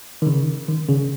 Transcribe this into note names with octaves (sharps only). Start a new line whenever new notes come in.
D#3
C#3
D#3
C#3